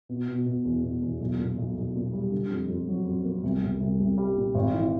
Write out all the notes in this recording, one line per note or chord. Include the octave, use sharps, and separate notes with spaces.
B2
B2
B2
E2
B2
E2
B1
A#2
B1
B1
A#2
G3
D3
F2
F2
F#3
F2
A#3
C2
C2
C2
C2
G3
A#2
G#1
E3